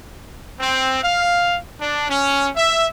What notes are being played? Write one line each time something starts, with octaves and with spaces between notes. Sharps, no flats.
C4
F5
D4
C#4
E5